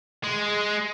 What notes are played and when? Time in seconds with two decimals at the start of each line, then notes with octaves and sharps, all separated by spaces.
0.24 G#3